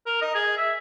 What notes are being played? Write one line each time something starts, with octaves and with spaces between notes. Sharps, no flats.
A#4
D#5
G#4
E5